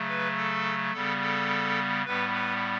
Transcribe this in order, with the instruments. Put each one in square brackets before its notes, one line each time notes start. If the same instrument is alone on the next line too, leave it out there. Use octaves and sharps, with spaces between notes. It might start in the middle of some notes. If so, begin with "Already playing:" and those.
Already playing: [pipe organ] C#3 F#3 A3
B4
A4
C#3 G3 B3 A4
A4
A2 G3 B3 B4
B4